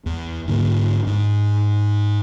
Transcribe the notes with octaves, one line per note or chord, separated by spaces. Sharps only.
E2
G#2 D3 A#3
G#2